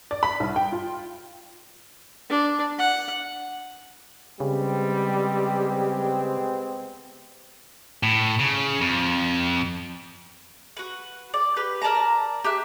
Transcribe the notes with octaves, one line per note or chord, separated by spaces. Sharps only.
D5
B5
C2
G5
F4
D4
F#5
C#3 G3 G#3 B3 C4 G4
A2
C#3
F2
F#4 B4
D5
G4 B4
A#4 D5 A5 A#5
G4 E5 F#6